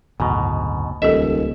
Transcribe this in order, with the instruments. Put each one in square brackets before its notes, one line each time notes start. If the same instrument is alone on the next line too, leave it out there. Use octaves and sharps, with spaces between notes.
[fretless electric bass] F#1 D2 [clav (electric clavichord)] G#2 B2
[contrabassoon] D#1 [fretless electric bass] C#2 [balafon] A4 D#5 [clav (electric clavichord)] E5